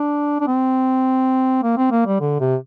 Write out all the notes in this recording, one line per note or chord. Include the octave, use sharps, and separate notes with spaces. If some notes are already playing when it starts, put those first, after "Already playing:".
Already playing: D4
D4
C4
A#3
C4
A#3
G3
D3
C3